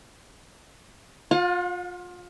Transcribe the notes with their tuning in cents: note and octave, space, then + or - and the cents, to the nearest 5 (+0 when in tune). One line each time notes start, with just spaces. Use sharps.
F4 +25 F#5 -40